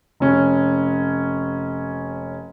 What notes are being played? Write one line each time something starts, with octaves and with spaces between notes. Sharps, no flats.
F1 C#4